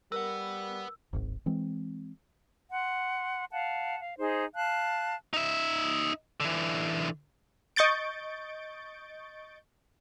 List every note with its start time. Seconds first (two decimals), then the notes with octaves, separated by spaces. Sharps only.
0.12 G3 A#4 B4 F#5 E6
1.13 D1 G#1 G#2
1.46 E3 G#3 C4
2.71 F#5 C6
3.53 F5 F#5 A5
3.99 F5
4.18 D#4 G#4 C5
4.55 F5 A5 F#6
5.33 D#4 E5
6.40 D3 E3
7.76 D#5 C#6 G6 A6 D7